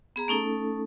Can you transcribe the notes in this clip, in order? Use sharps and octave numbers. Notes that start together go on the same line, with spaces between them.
B3 G#4 A#5
A3 C#4 D#4 A4